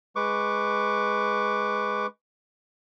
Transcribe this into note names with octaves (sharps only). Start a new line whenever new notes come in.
G#3 B4 C#6 D6